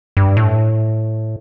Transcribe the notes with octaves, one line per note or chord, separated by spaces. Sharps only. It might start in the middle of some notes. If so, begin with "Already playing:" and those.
G2
A2